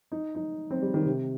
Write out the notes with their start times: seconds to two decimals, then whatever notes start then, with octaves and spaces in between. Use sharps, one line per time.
0.12 D#4
0.35 D#4
0.71 C4
0.82 G3
0.94 D#3
1.06 C3